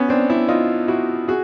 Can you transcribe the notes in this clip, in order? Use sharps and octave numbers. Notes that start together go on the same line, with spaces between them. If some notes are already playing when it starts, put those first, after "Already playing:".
Already playing: B3 C#4
C4 D4
D4 E4
D#4 F4
E4 F#4
F#4 G#4